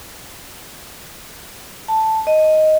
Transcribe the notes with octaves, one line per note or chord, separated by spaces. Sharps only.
A5
D#5